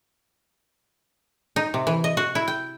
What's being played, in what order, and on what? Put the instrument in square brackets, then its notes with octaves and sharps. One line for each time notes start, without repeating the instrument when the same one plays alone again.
[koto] D#4
C3
E3
D#5
F#4
E4
G5